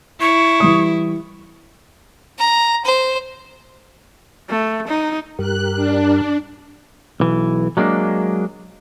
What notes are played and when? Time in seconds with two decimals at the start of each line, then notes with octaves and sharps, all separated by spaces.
0.21 E4 C#6
0.60 E3 G3 D#6
2.39 A#5
2.85 C5
4.50 A3
4.88 D#4
5.39 G2 G4 A#4 F#6
5.76 D4
7.20 B1 E3
7.77 F#3 G#3 A#3 D4